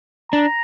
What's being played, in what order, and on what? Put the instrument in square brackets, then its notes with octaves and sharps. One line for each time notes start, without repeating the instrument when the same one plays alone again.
[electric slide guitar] D4 [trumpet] A#5